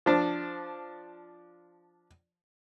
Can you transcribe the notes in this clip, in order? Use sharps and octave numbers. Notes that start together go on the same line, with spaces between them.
F3 D4